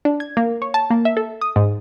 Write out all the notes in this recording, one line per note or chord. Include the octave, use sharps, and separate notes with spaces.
D4
G#6
A#3
C#5
A5
A#3
E5
A4
D#6
G#2